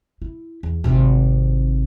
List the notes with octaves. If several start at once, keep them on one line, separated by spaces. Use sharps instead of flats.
E4
E2
G#1 C3